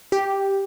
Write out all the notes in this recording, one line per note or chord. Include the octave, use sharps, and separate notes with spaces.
G4